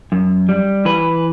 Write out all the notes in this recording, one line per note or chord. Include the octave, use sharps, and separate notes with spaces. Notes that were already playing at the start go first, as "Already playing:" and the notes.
F#2
G3
E3 B4